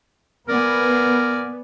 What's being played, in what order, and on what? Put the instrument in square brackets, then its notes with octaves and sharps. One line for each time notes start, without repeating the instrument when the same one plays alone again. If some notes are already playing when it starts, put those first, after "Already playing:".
[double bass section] B3 [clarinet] A#4 [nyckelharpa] D5 G#5